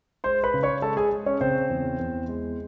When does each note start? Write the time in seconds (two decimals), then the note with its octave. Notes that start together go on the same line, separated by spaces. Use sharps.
0.24 G#3 C5 C6
0.43 B4 B5
0.54 C#3
0.63 C#5 C#6
0.82 G#3 A4 A5
0.97 G#4 G#5
1.12 G#3
1.26 C#4 C#5
1.41 C#3 C4 C5
1.70 E2
1.99 E2
2.28 G#3